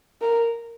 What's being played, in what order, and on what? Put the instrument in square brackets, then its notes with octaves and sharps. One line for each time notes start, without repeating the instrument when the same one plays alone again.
[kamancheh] A#4